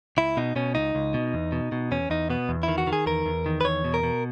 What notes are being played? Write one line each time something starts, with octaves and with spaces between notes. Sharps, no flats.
C#2 E4
B2 D#4
B2 C#4
C#2 D#4
C#2
B2
E2
B2
B2
E2 C#4
E2 D#4
B2 B3
E2
D#3 E4
F#4
D#3
G#4
E2 A#4
E2
D#3
B4
E2 C#5
B2
A#4
B2